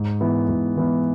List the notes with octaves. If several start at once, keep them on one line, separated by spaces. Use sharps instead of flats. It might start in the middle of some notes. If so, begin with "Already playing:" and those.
Already playing: G#2
E3 B3 E4
G#2
E3 B3 E4